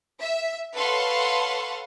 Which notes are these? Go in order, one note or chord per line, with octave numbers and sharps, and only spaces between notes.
E5
A4 B4 C#5 F5 F#5 C6